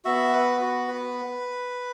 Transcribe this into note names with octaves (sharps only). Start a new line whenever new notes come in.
B3 F#4 E5
B4
F#4
B4